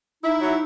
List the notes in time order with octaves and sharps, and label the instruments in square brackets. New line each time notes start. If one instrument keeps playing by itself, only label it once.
[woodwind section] D#4 [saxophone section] E4
[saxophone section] F#3